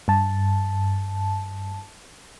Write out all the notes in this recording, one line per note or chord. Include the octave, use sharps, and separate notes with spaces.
G2 A5